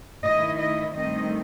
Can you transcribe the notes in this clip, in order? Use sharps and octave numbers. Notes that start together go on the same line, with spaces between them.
D#3 A3 E4 D#5
D#5
G2 D#3 A3 C4 D#5